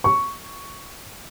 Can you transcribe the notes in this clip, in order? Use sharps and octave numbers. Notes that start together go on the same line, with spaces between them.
C#6